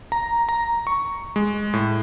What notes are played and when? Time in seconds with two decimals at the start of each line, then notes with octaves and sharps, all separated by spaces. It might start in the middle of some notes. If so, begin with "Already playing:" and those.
0.12 A#5
0.49 A#5
0.87 C#6
1.36 G#3
1.74 A2